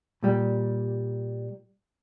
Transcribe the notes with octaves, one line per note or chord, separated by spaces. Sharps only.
A#2 G3